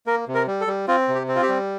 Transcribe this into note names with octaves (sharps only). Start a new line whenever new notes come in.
A#3 A#4
C3
A#4
G3
A4
G3
C4 F4
C3
G4
C4
F4
G4
G3